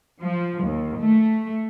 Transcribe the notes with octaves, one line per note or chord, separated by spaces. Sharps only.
F3
D#2
A3